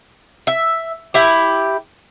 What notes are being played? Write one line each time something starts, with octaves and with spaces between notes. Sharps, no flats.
E5
E4 G4